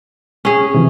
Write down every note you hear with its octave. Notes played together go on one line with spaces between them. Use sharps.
C#4 G#4
C3 E3 F3